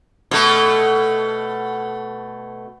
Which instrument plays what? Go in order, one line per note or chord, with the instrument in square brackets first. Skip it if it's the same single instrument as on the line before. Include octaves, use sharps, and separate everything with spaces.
[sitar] B2 A3